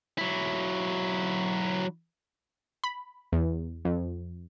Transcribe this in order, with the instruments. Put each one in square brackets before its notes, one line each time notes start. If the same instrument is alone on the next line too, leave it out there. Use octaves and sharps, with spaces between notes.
[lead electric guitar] F#3 E4
[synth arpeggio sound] B5
E2
F2